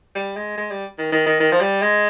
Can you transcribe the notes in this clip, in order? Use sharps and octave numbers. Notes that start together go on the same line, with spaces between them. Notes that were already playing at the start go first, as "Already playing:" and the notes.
G3
G#3
G#3
G3
D#3
D#3
D#3
D#3
F3
G3
G#3